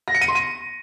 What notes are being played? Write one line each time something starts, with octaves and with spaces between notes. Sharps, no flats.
A#6
C#7
D#7
C6
D#7